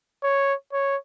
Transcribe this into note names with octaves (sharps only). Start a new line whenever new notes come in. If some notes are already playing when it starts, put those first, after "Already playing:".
C#5
C#5